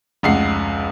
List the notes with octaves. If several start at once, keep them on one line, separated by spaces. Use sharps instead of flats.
F1 C#2 F#5 C7